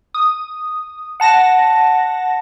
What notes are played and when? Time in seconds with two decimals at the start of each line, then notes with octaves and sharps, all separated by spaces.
0.14 D#6
1.20 F#5 A5 A#6